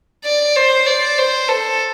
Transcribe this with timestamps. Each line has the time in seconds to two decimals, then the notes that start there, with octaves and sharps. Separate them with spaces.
0.25 D5
0.56 C5
0.87 D5
1.18 C5
1.49 A4